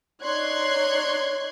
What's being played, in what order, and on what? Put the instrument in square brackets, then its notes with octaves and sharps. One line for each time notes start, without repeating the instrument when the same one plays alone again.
[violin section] D#4 C#5 D5 C6 F#6 G#6